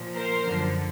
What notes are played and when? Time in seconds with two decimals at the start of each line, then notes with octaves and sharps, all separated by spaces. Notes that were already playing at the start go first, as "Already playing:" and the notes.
Already playing: A#2 F3
0.14 A#4 C5
0.43 F#2 D3 F3